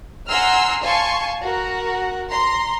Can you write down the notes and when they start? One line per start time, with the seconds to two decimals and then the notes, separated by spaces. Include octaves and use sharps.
0.28 F#5 G#5 A#5 C6 E6 F6
0.84 F5 G#5 A5 C6 C#6
1.43 F#4 A#4 F#5
2.30 A#5 C6